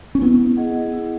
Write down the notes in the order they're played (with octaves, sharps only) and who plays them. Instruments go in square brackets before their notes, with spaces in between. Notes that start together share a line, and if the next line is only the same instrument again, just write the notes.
[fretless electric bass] C#4
[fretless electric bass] B3 [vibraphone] E4
[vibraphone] G#4 D#5 F#5
E4